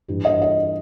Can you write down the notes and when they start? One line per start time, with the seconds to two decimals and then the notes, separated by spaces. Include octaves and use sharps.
0.08 G2 E3 G3
0.25 D#5
0.42 D#5